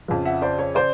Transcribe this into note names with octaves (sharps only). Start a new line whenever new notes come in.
F2 C#3 F3
E5 F#5
C5 D5
C#5
C#3 C5 D5